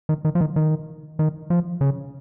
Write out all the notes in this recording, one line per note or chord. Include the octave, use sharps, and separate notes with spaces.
D#3
D#3
F3
D#3
D#3
D#3
F3
C#3